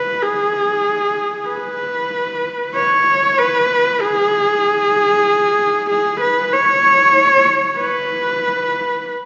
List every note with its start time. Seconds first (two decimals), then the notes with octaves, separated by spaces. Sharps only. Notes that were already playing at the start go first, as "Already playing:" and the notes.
Already playing: B4
0.23 G#4
1.50 B4
2.75 C#5
3.38 B4
4.01 G#4
5.90 G#4
6.21 B4
6.53 C#5
7.79 B4